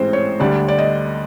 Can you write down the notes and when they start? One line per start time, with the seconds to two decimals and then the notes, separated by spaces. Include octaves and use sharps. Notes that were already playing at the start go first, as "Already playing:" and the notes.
Already playing: A1 G#2 E3 G#3 C4 C5
0.13 C#5
0.40 D2 D3 G3 D5
0.68 D5
0.78 D#5